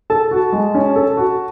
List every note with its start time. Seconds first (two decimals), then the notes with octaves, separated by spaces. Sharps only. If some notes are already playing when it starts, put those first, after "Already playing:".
0.10 A4 A5
0.31 F#4
0.53 G#3
0.74 C#4
0.96 A4
1.17 F#4